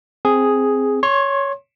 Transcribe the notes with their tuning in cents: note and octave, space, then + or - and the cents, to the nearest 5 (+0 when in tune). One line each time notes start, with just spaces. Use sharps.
C4 +0 G#4 +0
C#5 +5 C6 +30